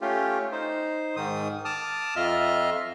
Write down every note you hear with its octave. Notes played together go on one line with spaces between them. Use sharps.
A3 C#4 F4 G4
D#4 C5
G#2 D#3 D#6
A5 D6 D#6 F6
F2 F4 D#5 E5 F6